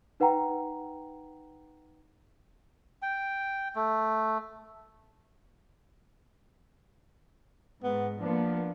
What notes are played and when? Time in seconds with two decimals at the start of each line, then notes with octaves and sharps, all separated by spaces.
0.20 D#4 B4 F#5 G5 A#5
3.02 G5
3.75 A3
7.83 G#2 B3
8.20 F3 A#3 B3 D4